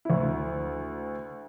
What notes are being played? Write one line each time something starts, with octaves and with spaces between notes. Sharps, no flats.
D2 E4